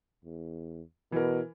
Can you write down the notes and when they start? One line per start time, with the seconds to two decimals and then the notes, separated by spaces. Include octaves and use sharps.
0.25 E2
1.12 B2 E3 A#4